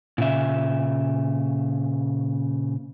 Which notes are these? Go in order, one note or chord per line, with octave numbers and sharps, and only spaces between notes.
A#2 C#3 E5